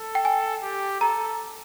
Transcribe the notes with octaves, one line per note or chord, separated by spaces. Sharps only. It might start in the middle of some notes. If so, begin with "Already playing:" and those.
Already playing: A4
G5
G#5
G4
A4 A#5